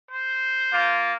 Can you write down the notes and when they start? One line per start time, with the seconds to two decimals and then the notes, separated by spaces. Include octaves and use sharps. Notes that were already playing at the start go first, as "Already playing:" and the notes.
0.10 C5
0.71 A#3 F4